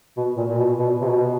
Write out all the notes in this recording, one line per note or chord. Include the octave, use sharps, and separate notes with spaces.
B2
A#2
A#2
B2
B2
C3
B2